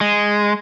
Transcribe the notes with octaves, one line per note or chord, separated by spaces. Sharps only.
G#3